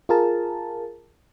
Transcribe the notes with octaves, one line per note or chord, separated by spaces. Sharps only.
F4 G#4 A#4 A5